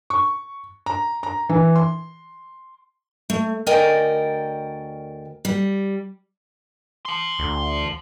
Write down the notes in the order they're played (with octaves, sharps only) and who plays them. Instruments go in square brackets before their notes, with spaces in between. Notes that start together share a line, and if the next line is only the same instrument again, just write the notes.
[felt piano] C#6
A#5
A#5
E3
C6
[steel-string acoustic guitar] A3
D2 A#4 D5 D#5 G5 G#5
G3
[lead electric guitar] A5 C6
[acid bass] D2